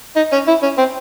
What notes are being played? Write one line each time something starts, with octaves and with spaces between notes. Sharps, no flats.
D#4
C#4
E4
C#4
C4